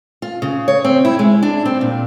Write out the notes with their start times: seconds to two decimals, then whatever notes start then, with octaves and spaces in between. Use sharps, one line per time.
0.22 F4
0.42 C#3
0.68 C#5
0.84 C4
1.05 E4
1.19 G#3
1.43 D4
1.65 C4
1.81 A#2